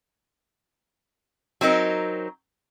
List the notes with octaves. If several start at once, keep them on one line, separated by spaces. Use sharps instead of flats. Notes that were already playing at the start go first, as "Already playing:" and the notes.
F#3 C4 D#4 A#4